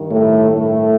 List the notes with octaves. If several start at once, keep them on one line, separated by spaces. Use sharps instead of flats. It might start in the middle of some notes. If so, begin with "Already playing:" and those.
Already playing: G2 D#3
A2 A3
A2 A3